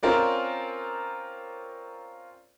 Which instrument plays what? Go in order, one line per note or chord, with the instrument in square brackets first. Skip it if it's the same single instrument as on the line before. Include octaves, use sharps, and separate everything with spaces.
[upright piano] C4 C#4 F4 A#4 D5